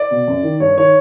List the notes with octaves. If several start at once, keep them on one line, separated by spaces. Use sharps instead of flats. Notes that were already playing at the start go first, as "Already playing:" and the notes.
Already playing: D5
B2
F#2
D#3
G2 C#5
D#3 C#5